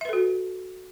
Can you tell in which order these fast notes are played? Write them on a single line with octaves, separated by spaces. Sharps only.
E5 B4 A4 F#4